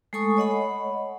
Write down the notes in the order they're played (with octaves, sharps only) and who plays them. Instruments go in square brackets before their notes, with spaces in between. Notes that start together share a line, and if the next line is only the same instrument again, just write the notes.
[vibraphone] G#3 A3 A4 G#5 C#6 D#6
C#5 D#5 F#5 B5